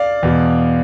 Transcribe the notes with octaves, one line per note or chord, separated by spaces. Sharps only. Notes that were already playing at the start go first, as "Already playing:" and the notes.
Already playing: D5 F5
E2 B2